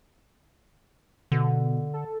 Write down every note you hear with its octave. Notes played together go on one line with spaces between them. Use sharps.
B2 D3
A4